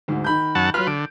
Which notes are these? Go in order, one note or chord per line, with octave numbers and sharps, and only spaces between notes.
D2 G#2
D#3 B5 G6
F#2 F#5 A5
F#3 F4 B4 F6
D3 D7